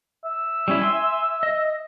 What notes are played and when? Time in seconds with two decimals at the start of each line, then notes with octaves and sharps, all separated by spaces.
0.25 E5
0.68 G3 C#4 E4
0.81 G#5 C6
1.43 D#5